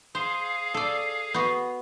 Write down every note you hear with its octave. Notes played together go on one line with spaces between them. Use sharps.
G#4 C5 F5
A4 D5
B3 F#4